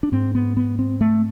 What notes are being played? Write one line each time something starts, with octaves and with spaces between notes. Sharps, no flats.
D4
G#2 C4
B3
B3
C4
A3